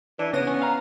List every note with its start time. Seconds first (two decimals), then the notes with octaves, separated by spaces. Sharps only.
0.19 E3 D4
0.33 C#3 B3 A#6 D#7
0.47 C#4
0.62 F5 A#5